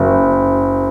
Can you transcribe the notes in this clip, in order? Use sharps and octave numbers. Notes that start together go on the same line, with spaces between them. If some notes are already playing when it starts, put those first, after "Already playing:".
Already playing: F#1